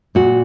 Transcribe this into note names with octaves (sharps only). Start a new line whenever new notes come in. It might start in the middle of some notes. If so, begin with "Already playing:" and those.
A#2 F#4